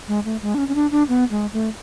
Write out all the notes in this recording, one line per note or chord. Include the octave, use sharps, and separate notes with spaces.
G#3
A3
G#3
D4
C#4
C#4
D4
D4
B3
G#3
A3